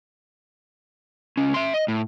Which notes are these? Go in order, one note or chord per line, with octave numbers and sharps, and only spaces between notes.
C#2 C#4
E5 C6
D#5
A2